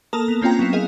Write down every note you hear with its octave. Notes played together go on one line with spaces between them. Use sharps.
A#3 A4 A#4 A5 A#5 D#6
B3 F7
A#3 C4 C#4 F4 G5 A#5
F#3 B3 E4
G#4 A#4 D#5 F5